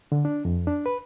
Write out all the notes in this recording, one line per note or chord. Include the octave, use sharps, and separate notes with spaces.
D3
D4
F2
D4
B4